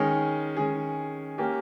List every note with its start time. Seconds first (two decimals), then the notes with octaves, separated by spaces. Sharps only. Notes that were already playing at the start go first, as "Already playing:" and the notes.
Already playing: D#3 G#3 C#4 G#4
0.57 D#3 G#3 C#4 G#4
1.38 A#3 C#4 G4